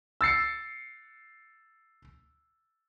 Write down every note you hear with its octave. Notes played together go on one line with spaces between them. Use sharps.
E6 A6 C7 C#7